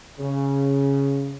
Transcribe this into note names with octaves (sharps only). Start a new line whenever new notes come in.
C#3